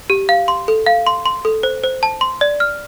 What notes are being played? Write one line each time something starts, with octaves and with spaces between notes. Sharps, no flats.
G4
F5
C6
A4
F5
C6
C6
A4
C5
C5
A5
C6
D5
F6